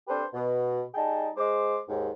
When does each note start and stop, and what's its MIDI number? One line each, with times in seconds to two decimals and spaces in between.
0.08 0.23 60
0.08 0.23 62
0.08 0.23 67
0.08 0.23 69
0.08 0.23 71
0.08 0.23 72
0.33 0.82 47
0.95 1.28 55
0.95 1.28 63
0.95 1.28 68
0.95 1.28 79
0.95 1.28 81
1.37 1.78 56
1.37 1.78 72
1.37 1.78 86
1.89 2.10 39
1.89 2.10 44